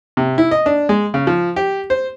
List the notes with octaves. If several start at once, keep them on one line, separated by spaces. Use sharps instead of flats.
C3
E4
D#5
D4
G#3
C#3
F3
G4
C5